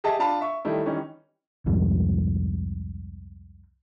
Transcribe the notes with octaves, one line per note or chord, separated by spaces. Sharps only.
G4 G#4 D#5 E5 A5
D4 F4 F5 A5 B5
E5 C#6
D#3 G3 A3 E4
D#3 E3 G3 C#4
C2 F2 G#2